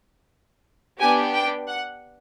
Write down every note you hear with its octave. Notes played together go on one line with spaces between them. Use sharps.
B3 D4 G4 G#5
G5
F#5